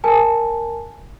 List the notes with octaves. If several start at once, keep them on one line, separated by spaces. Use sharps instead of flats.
A#4 G#5 A5